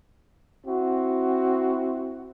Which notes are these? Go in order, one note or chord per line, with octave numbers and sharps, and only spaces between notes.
C4 E4 F#4